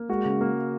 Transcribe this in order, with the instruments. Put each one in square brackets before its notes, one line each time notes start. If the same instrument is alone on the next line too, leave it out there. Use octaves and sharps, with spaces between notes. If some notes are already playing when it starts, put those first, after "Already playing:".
Already playing: [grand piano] A#3
[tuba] G#3 [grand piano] F#4
[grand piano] C#3
A#3